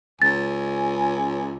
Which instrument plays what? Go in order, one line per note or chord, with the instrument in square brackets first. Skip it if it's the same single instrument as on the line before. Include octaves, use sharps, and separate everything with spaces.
[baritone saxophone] C#2 [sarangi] G#5 [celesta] A6